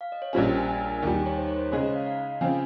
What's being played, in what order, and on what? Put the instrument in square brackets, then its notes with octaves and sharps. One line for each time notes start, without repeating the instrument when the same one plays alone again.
[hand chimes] F5
D#5
C#5
[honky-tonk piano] A#1 A#2 G3 C#4 [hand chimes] C5
[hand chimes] G5
G#5
G#5
G#5
[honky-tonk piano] D#2 D#3 G3 [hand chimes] G5
[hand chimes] C#5
C5
C#5
C5
[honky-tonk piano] C#3 G#3 D#4 G#4 [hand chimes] C#5
[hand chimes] D#5
F5
F5
[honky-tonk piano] C#3 F3 C4 F4 [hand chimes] G#5